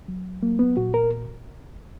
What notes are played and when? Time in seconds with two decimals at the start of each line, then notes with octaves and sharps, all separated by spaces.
0.08 F#3
0.43 F#3 A#3
0.59 B3
0.77 A#2 F#4
0.94 A#4